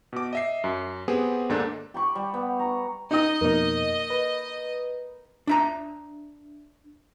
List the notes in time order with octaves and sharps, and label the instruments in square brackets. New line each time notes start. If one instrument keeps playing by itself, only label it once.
[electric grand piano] B2 D6
D#5 E5 C7
F#2
B3 C4 G4 G#4
D#2 G#2 A#3 D4 A4
[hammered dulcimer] G4 B5 C#6
G3
B3
A#5 C#6
[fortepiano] D#4 D#6 [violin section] D#5
[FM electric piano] F2 B2 [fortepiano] A#3 D#4
[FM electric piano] B4
[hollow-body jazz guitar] D4 E5 A#5